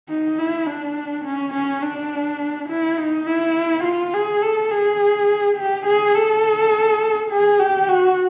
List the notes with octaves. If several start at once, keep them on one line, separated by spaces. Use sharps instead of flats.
D#4
E4
D4
C#4
C#4
D4
E4
D#4
E4
F4
G#4
A4
G#4
G4
G#4
A4
G#4
G4
F#4